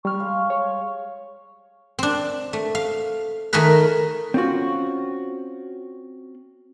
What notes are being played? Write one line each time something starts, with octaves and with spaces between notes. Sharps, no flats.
G3 C#6 F6
G#3 F5
C#5
C4 D4
A3
F5
D#3 A3 D#4 G#4 A#4 B4
C4 C#4 F4 F#4